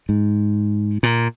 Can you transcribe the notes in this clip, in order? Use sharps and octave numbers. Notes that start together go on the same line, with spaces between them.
G#2
A#2